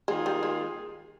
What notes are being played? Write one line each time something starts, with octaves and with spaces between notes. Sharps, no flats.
D#3 G#3 A#3 F4 G#4
G3
G#3